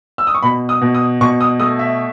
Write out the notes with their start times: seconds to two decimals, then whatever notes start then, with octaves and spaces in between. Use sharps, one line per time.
0.18 E6
0.27 D#6
0.35 C#6
0.43 B2 B5
0.69 D#6
0.81 B2
0.95 D#6
1.21 B2 C#6
1.41 D#6
1.59 A3 D#6
1.79 E5